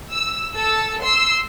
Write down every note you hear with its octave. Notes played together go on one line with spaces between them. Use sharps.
E6
A4 E6
C6 E6